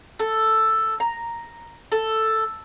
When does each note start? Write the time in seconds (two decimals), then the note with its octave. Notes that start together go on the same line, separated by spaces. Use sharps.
0.19 A4
1.00 A#5
1.92 A4